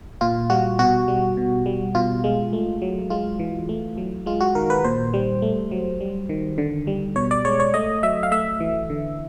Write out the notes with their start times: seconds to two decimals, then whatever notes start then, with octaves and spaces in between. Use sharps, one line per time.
0.21 A#2 F4
0.50 G3 F#4
0.79 B2 F#4
1.08 G3
1.37 B2
1.66 G3
1.95 B2 F4
2.24 G#3
2.53 A3
2.82 F#3
3.10 G#3 F4
3.39 E3
3.69 A3
3.97 F#3
4.26 G#3 F4
4.40 F#4
4.55 D#3 A#4
4.70 B4
4.84 A#2 C5
5.14 G3
5.42 A3
5.71 F#3
6.00 G3
6.29 D#3
6.58 D3
6.87 G3
7.16 B2 C#5
7.31 D5
7.45 G#3 C#5
7.60 C#5
7.74 A3 D#5
8.03 F#3 E5
8.23 F5
8.32 A3 E5
8.60 E3
8.90 D3